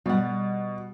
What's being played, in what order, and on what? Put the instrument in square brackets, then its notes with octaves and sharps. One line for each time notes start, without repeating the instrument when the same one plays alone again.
[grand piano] B2 [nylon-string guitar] G3 F#5